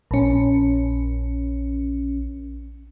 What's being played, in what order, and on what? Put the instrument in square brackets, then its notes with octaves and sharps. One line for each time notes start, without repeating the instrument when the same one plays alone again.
[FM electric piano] A#1 C#4